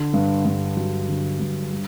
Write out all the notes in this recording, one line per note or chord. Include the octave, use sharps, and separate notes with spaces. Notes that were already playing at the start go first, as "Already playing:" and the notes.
Already playing: D3
G2
G2
F#3
D3
G2
G3